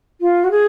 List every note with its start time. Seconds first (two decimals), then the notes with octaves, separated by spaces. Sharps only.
0.21 F4
0.44 F#4
0.51 G#4